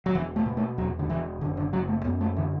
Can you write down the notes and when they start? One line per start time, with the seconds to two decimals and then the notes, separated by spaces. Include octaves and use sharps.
0.06 F#3
0.15 E1 E3
0.36 A3
0.46 B2
0.57 A3
0.78 E2 F#3
0.99 D3
1.10 E1 E3
1.41 F#1 D3
1.57 D3
1.73 F#1 F#3
1.89 A3
2.05 F#2 B3
2.21 A3
2.37 D3 E3